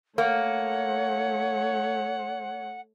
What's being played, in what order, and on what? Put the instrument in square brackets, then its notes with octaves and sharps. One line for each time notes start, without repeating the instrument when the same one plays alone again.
[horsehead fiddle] A3 C#5 [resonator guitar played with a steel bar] A#3 [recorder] F#5